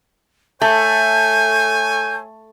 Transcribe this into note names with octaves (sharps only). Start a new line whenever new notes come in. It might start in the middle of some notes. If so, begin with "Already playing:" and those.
A3 A4 C#5 G#5 G6